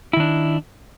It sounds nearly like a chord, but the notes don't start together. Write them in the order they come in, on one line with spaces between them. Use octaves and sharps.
E4 D#3 D4